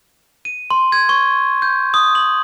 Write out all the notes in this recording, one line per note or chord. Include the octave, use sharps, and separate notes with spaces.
D#7
C6
G#6
C#6
G6
D#6
F#7